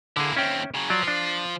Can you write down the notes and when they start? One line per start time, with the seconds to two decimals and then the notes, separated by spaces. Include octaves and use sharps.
0.17 D3 A#3 E4 G#4
0.37 D#2 C4 C#4 E5 G5
0.74 C#3 F#3
0.90 F3 F#3 F4 D5 F5
1.08 D4